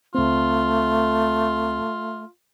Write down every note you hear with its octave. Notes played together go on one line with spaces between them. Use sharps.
C#2 A3 C4 F4